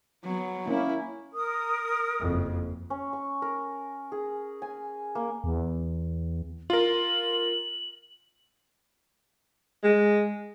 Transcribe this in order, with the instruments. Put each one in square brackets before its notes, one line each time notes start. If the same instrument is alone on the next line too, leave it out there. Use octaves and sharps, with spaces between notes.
[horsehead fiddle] F#3 B3
[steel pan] A#3 C#4 [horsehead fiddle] E4
[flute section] A#4 D#6
[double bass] F#1 F2
[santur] C#4
C#6
A#4
G#4
G#5
A#3
[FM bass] E2
[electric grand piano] F4 A#4 [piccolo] F#7
[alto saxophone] G#3